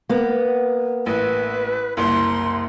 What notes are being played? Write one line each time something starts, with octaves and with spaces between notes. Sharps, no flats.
A#3 B3
A1 B4
F#1 C2 C6